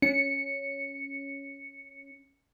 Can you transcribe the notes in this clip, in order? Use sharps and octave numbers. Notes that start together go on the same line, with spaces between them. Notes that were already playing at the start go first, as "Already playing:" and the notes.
C#4 C#7